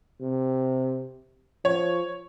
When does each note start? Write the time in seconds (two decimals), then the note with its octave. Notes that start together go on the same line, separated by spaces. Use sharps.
0.21 C3
1.65 F3 C#5